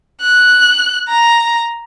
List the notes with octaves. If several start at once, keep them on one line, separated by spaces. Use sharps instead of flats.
F#6
A#5